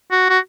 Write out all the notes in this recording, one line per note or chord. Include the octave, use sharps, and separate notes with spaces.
F#4
F#4